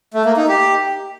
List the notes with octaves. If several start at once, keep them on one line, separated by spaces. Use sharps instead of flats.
A3
A#3
D#4
G4